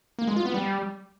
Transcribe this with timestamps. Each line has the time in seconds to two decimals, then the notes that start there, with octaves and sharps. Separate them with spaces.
0.19 A#3
0.27 G#3
0.36 F4
0.45 B3
0.54 G3